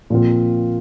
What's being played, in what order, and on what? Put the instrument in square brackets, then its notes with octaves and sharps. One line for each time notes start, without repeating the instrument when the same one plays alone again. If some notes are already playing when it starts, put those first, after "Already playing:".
[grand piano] A#2 F3 C4 F4